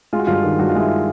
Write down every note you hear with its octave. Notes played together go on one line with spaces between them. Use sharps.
G#3 F4
F#4
G2 F4
D#3
G2 F#4
F4
G#3 E4
F4